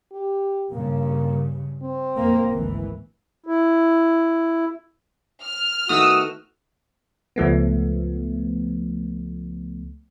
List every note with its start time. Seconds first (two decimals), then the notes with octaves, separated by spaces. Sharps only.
0.12 G4
0.72 G2 C#3 A#3
1.82 C4
2.15 F2 A#3
2.48 G#1 D2 E3
3.46 E4
5.43 F6
5.89 D#3 A3 B3 F#4 D#6 E6
7.36 C#2 F3 A3 B3